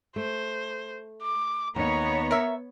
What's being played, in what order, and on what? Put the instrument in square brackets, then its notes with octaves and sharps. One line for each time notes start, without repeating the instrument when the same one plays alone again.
[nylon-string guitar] A3 [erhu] C5
[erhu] D6
[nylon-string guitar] D#2 D#4 [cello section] B3 C#5 [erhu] A#5
[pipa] A#4 E5